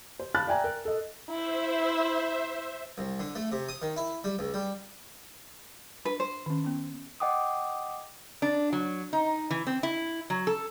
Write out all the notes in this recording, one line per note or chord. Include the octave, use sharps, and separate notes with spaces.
C5
F5 A5 B5 F#6 A6
D5 E5 G5 G#5 A#5
A#4
A4 D#5
E4 C5 E5
C2
D3
A3
C3
D#6
D#3
E4
G3
C#2
G3
D4 B4
C5
D#3 C#4
B3 C#4
D#5 F#5 G5 D6 D#6
D4
F#3
D#4
E3
C4
E4
F#3
A4